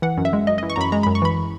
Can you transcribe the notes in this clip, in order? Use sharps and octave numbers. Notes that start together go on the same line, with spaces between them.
E3 F#5
F#2
E5
G#3
F#2 D#5
E3 D#5
C#6
F#2 A#5 B5
G#3 A#5
F#2 B5
C#6
E3 B5